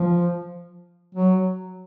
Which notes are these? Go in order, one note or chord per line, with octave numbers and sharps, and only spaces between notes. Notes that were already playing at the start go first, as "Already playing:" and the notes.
Already playing: F3
F#3